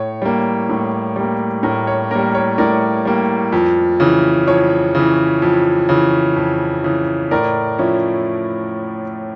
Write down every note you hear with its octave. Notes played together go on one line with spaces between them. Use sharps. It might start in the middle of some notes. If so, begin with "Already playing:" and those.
Already playing: A2 C#5
G3 A#3
A2
G3 A#3
A2 A#4
C#5
G3 A#3 A#4
C#5
A2 A#4 D5
G3 A#3
F2
C#3 E3
F2 C#5
C#3 E3
F2
C#3 E3
F2
C#3 E3
A2 A#4 D5
F3 C#4 E4